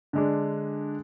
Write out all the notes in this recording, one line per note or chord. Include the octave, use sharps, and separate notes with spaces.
D3 G#3 D4